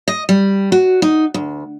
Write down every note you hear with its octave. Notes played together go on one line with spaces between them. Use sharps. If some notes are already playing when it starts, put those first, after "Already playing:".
D#5
G3
F#4
D#4
D2